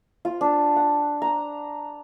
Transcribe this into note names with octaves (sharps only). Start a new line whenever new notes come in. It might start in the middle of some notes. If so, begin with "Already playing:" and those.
F4
D4
F#5
A#5